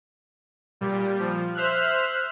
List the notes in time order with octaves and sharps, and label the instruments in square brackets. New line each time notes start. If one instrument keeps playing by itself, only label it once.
[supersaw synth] A#2 G3
F3
C5 E5 F6 F#6